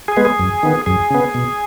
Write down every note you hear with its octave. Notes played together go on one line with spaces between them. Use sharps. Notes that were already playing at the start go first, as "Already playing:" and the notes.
G#4
G#3 B3
G#4
F#2
D#3 B3
F#2 G#4
C#3 B3
B2